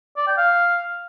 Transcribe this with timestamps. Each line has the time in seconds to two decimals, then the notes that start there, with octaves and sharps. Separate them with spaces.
0.17 D5
0.27 G5
0.37 F5